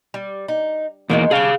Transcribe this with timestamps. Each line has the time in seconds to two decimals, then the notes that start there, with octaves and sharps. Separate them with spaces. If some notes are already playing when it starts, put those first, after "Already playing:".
0.14 G3
0.48 D#4
1.10 E2 D#3 F#3 G#3 A#3
1.31 G3 D4 G#4 F5